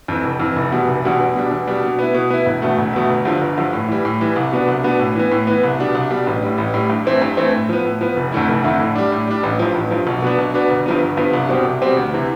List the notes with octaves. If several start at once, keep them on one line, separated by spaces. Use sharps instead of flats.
F2 E3
F1
F2 E3
F1
E2 B2 G3
F1
E2 B2 G3
E2
B2 G3 D4
E2
B2 G3 D4
B2
B3 E4
B2
B3 E4
E1
E2 B2 A3
E1
E2 B2 A3
G1
G2 D3 F3
G1
G2 D3 F3
A2
E3 G3
A2
E3 G3
C2
B2 B3 D4
C2
B2 B3 D4
A2
E3 B3
A2
E3 B3
C2
B2 G3 D4
C2
B2 G3 D4
A1
A2 G3
A1
A2 G3
G2
E3 A3 C4 E4
G2
E3 A3 C4 E4
A2
F3 B3
A2
F3 B3
F1
F2 D3 A3 E4
F1
F2 D3 A3 E4
A2
G3 D4
A2
G3 D4
A1
G2 F3
A1
G2 F3
B1
B2 B3 D4
B1
B2 B3 D4
G1
G2 F3 B3
G1
G2 F3 B3
C2
B2 G3 C4 G4
C2
B2 G3 C4 G4
D2
C3 E3